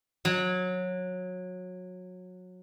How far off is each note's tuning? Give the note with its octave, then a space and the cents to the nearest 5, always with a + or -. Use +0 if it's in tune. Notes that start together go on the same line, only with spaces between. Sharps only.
F#3 -20